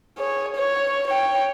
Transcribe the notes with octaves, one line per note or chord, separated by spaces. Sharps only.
G#4 C#5
C#5
C#5 G5